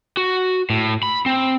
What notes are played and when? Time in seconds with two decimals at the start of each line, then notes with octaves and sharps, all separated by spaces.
0.17 F#4
0.70 A2
1.03 B5
1.26 C4